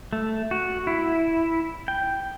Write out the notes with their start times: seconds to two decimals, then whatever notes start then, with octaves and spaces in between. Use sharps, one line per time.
0.13 A3
0.51 F#4
0.87 E4
1.88 G5